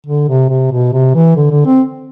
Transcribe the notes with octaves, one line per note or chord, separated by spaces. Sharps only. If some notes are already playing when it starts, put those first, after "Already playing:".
D3
C3
C3
B2
C3
E3
D3
D3
C4